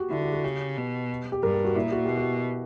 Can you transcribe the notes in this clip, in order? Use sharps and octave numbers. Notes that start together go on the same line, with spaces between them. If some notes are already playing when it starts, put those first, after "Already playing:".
Already playing: F#4 G4
D3 E4
F#4
F#4
C#3 G4
B2
G4
G2 A#4
G4
F#4
A#2 E4
F#4
B2 G4
F#4